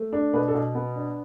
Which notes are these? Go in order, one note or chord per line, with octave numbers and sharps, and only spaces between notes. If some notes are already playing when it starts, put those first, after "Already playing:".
Already playing: A3
D4
B2 B4
A4
B2
B3
D4